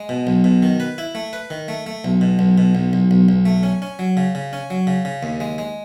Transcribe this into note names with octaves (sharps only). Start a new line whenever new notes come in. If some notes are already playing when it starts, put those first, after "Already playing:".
Already playing: G#3
B2
B1
B2
D#3
B4
E4
A3
B4
D#3
A3
A3
B1
B2
B1
B2
B1
B1
B1
B1
A3
C#4
C#4
F#3
C#3
C#3
C#4
F#3
C#3
C#3
D#2
G#3
G#3